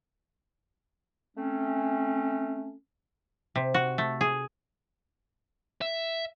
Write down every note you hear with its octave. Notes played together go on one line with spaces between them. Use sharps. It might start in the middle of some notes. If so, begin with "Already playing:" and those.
A3 C4 C#4
C3
F#4
A3
G#4
E5